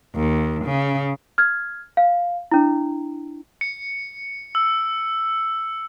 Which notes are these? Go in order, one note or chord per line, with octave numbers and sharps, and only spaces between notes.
D#2
C#3
F6 G#6
F5
D4 E4
C#7
E6